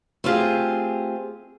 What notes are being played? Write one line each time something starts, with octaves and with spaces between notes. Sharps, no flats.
A3 C4 F4 G4 G#4